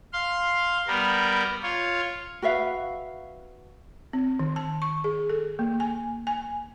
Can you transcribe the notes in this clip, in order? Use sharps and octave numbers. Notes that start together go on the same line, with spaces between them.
F5 C6
G3 B3 A#4
F4 C#5
F#4 B4 E5 F5
C4
D#3
A5
C#6
G#4
A4
A#3
G#5
G#5